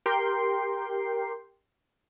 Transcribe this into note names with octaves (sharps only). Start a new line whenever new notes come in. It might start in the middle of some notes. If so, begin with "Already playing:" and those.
G4 A#4 G5 C6